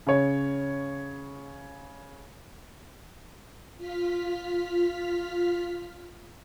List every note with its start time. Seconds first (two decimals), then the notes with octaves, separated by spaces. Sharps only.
0.07 C#3 C#5
3.78 F4 F6 B6